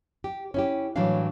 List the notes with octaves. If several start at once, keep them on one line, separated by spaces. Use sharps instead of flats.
G4
C#4 E4 G4
A2 E3 F#3 G3 D4 F5